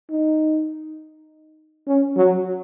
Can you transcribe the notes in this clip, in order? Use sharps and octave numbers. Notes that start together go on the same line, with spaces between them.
D#4
C#4
F#3